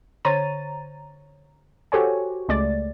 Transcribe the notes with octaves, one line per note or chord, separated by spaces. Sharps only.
D3 C5 C#5 A#5 A6 D#7
F#4 G4 A4 C5 C#5 G#5
C#2 G#3 A3 D5 A6